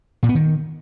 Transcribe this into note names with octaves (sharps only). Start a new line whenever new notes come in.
A#2
B3
D#3